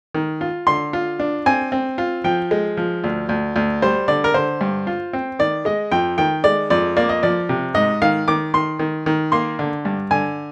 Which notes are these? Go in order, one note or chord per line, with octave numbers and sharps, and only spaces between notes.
D#3
F4
D3 C6
F4
D4
C4 G#5
C4
F4
F3 G5
G#3
F3
D2
D2
D2
G3 C5
D3 D5
A#4
D3 C5
G2
F4
C4
D#3 D5
G#3 D#5
F2 G5
D#3 G5
G#3 D5
F2 D5
A#3 D5
D#5
F3 D5
C3
G#2 D#5
D#3 F5
D#3 D6
D#3 C6
D#3
D#3
A#3 C6
D3
G2
D3 G#5